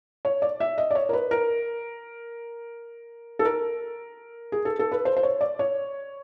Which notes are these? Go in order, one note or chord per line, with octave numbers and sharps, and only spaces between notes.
C#5
D5
E5
D#5
D5
C#5
A#4
B4
A#4
A4
A#4
G#4
A4
A4
B4
C5
C5
C#5
D5
C#5